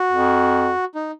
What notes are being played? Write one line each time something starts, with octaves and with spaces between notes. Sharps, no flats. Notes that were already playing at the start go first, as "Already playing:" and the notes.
Already playing: F#4
F2
D#4